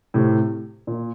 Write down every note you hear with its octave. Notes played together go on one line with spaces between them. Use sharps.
A2 C3
A#2